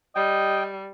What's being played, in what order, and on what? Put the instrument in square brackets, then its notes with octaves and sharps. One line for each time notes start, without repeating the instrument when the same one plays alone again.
[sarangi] G3 [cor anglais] D#5 [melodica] G5